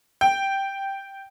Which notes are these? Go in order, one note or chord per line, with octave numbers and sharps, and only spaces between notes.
G5